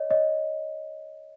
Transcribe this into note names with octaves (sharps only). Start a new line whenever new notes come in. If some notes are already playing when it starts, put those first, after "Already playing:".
Already playing: C#5 D#5
C#5 D#5